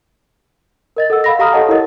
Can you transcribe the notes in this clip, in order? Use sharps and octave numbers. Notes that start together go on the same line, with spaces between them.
A#4 D#5 A6
A4 F#5 E6
F5 B5 A#6
G4 F5 A#5 D#6 F6
G4 A4 C#5 D#5 F#5 A5
E4 A#4 D#5 A6